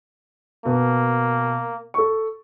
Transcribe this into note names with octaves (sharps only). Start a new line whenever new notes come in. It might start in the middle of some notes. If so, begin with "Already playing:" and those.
B2 A#3 B3
A4 C#6